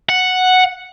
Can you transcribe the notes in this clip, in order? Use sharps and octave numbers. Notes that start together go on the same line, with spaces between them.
F#5